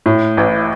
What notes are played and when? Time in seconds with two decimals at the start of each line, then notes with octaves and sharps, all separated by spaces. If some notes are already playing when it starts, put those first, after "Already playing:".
0.06 A2
0.37 A1